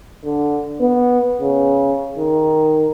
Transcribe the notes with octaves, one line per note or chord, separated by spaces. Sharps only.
D3
B3
C#3
D#3